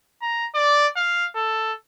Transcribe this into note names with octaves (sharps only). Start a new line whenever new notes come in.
A#5
D5
F5
A4